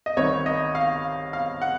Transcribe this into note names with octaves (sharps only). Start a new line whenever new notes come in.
D#5
C2 C3 D#3 C#5
D#5
F5
F5
F#5